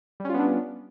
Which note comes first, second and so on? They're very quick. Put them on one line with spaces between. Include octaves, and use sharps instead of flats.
G3 C#4 F4 B3 D4